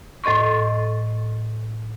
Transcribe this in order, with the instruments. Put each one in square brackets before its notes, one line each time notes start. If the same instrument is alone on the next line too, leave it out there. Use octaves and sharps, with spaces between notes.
[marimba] A2 A4 D#5 C6 C#6